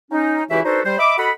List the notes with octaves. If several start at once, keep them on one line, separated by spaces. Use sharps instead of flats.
C#4 D#4
C#2 E3 E4 F#4 G4 E5
D4 D#4 F#4 A4 B4 C5
G3 C5
D#5 E5 B5 D6
F#4 A4 D#5 F#5 B5